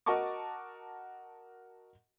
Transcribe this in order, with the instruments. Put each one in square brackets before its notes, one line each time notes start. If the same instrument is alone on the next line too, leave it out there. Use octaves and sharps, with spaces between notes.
[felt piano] F#4 A#4 D#5 A5 C#6 D6